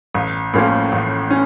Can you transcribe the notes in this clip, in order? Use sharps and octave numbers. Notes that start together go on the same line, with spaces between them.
A1
A2 F3 A#3 C#4
A1
C#4